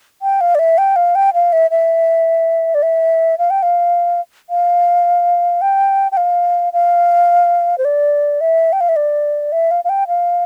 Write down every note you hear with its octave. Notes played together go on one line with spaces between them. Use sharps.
G5
F5
D5
E5
G5
F5
G5
F5
E5
E5
D5
E5
F5
G5
F5
F5
G5
G5
F5
F5
C5
D5
E5
G5
F5
E5
D5
E5
F5
F5
G5
F5